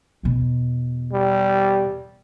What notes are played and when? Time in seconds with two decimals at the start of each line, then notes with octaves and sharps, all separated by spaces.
0.23 E2 B2
1.12 G3